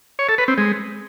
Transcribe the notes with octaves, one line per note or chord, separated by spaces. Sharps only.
C#5
A4
B4
C4
G#3